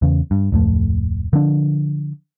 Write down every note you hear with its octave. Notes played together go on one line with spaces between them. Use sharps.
E2 C#3
G2
D1 F2 A3
D3 F3 D4